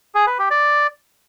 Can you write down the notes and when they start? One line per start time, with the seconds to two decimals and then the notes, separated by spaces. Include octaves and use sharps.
0.15 G#4
0.27 B4
0.39 G4
0.51 D5